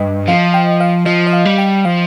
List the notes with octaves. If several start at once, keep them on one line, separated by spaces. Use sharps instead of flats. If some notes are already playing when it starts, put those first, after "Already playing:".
Already playing: G2 D#5
F3 F5
G5
F5
F3 D#5
D#5
F5
G3
G5
F3 F5